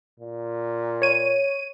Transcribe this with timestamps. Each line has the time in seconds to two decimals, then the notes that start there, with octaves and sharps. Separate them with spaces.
0.20 A#2
1.02 C#5 D#7